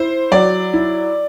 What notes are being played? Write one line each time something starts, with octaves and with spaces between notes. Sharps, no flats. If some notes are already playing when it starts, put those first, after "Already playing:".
Already playing: E4 C5
F#3 D5
E4